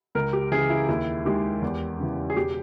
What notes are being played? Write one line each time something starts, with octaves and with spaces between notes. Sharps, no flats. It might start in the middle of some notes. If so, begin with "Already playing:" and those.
C#2 A#4
G4
C#3 E3 G#4
E4
D#2 E4
D#3 G#3 G4
E2
C#3 E3
G#4
E1 G4